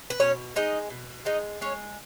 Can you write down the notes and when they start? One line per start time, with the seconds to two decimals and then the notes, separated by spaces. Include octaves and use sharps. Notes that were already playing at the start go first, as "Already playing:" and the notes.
0.10 B4
0.20 B2 C#4 C#5
0.56 G#3 D#4 D#5
0.90 B2
1.25 G#3 D#4 D#5
1.61 G#3 C#4 C#5